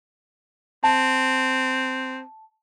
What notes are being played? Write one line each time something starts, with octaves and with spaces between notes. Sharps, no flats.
C4 A5